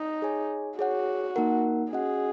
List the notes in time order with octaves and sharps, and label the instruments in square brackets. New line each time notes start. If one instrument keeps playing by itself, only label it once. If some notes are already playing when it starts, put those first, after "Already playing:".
Already playing: [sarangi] D#4
[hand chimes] G#4 C#5 G#5
[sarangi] F#4 [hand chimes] G#4 C#5 F#5
[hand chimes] A#3 D#4 A#4 F#5
[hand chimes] C#4 F#4 D#5 F#5 [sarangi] G#4